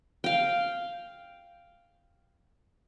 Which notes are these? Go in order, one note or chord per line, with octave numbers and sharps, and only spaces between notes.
F5 G5